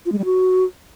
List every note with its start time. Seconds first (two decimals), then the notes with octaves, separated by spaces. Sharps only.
0.06 F4
0.12 G#3
0.19 G3
0.25 F#4